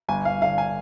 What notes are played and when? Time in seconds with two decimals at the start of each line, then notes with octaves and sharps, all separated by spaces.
0.08 G1 G#5
0.25 G1 F5
0.42 D3 F5
0.58 G#5